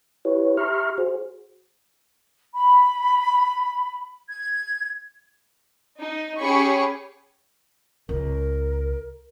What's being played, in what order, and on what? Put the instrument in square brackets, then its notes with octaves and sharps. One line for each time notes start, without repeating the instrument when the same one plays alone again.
[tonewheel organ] E4 G4 B4 C#5
G4 E5 A#5 C6 C#6 F6
F#4 G#4 C5
[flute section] B5
G#6
[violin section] D#4
C#4 G4 G#4 C#5 B5 C#6
[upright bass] C#2 [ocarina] A#4